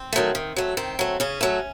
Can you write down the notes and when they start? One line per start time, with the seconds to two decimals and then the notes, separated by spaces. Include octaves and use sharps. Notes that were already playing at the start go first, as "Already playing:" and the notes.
Already playing: C4
0.13 D#3 F#3 A3
0.35 D#3
0.56 F#3 A3
0.77 D#3 C4
0.99 F#3 A3
1.20 C#3 C#4
1.41 F#3 A3